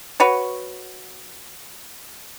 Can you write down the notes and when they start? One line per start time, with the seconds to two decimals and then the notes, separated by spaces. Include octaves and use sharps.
0.20 F#4 B4 C#5